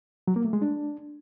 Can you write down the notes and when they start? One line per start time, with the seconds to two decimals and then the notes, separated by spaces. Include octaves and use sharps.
0.28 F#3
0.36 A#3
0.45 A3
0.53 G#3
0.62 D4